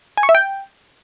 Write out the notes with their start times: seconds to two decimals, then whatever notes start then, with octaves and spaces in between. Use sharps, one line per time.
0.17 G#5
0.23 C#6
0.29 E5
0.35 G5